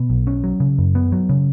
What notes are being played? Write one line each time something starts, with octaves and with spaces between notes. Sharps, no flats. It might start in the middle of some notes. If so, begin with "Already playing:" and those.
Already playing: B2
B1
C#4
F#3
C#3
F#2
B3
F#3
C#3